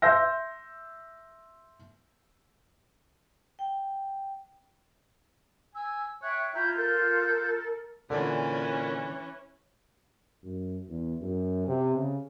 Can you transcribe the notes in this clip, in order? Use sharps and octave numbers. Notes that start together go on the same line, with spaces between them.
E5 C6 E6 G6 A#6
G5
G#5 E6
C#5 E5 G5 C#6 F#6
E4 F4 A#5 G6
A4 A#4 G6
A#2 D3 E3 C#4
F#2
E2
F#2
C3
C#3